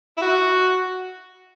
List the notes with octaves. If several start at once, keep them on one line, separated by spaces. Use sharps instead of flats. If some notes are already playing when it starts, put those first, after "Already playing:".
E4
F#4